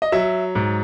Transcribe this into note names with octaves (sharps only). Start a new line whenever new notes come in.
D#5
F#3 E5
G#2